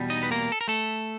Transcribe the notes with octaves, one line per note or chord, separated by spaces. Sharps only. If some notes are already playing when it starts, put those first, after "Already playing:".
Already playing: E2 B2 G3
D#4 D#5
B4
A#3 A#4
A4
A#4
A3 A4